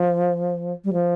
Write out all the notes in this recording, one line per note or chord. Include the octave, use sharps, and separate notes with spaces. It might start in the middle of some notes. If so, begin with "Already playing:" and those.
Already playing: F3
G3
F3